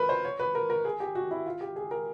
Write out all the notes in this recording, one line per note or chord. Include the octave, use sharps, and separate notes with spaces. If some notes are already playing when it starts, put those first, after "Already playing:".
Already playing: A#4 B4
C5
C#5
B4
A#4
A#4
G#4
G4
F#4
E4
F4
G4
G#4
A#4